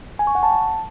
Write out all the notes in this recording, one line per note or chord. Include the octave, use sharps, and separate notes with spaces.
G#5
C#6
F#5
A5